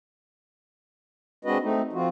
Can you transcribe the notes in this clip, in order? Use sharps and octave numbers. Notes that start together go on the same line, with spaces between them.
G#3 C4 D4 F#4 B4 D#5
A3 C4 D#4
F3 C4 F4 F#4